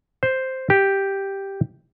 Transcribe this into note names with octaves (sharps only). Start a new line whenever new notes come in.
C5
G4